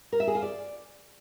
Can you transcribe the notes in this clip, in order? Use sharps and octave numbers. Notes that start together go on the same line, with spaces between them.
A#4
E5
G#4
F4
D5